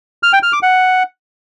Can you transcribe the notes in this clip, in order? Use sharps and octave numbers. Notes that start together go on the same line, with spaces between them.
F6
G5
F6
D6
F#5